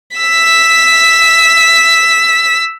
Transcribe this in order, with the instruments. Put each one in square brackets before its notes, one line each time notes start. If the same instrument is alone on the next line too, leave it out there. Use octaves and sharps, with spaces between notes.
[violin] E6 B6